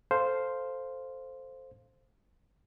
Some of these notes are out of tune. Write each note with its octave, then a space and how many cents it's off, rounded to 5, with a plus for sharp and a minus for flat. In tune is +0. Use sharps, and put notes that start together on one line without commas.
A4 +0 C5 +0 F5 +0